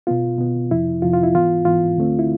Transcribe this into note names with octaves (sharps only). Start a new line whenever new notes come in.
B2 B3 F4
B2 B3
F2 C3 F3 E4
F2 C3 F3 F4
F4
E4
G#2 E3 B3 F4
G#2 E3 B3 F4
D2 D3 A3 C4
E4